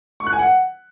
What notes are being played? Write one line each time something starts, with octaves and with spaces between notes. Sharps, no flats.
C#6
F#6
G#5
F#5